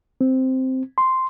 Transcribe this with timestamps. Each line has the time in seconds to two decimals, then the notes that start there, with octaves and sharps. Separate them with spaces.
0.21 C4
0.98 C6